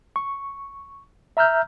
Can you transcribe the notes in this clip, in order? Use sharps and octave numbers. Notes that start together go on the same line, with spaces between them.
C#6
E5 A#5 E6 F6 G6